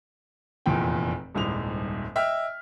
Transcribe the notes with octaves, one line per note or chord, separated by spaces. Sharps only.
F1 E2 A#2 G5
D#1 C2 G#2 F7
D#5 E5 G5 F6 B6